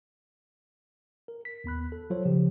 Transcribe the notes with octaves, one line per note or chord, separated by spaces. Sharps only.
A#4
B6
D#2 B3 B5 F#6
A4
F#3 F4 A4 C5 C#5
C#3 F3 G4